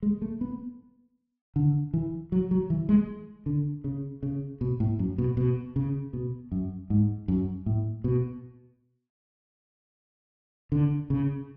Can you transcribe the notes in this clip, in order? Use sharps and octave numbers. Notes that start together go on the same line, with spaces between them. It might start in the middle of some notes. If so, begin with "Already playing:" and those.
G#3
A3
B3
D3
E3
F#3
F#3
E3
G#3
D3
C#3
C#3
B2
A2
F#2
B2
B2
C#3
B2
F#2
G#2
F#2
A2
B2
D3
C#3